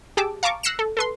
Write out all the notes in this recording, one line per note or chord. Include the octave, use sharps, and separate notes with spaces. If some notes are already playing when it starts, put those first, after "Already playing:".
G4 G#4 A5 D6 E6
F5 A5 A#5 C#6 D6
E6 F#6 A#6 C7 C#7 E7
A4
A4 B4 C6